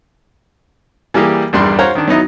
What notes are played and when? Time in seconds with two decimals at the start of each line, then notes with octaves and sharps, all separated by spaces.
1.14 E3 G3 A#3 G4 G#4
1.53 A#1 E2 G2 G3 B5 C6
1.79 C5 C#5 F5 F#5 A#5
1.95 D#3 D4
2.08 F#3 B3 D#4 E4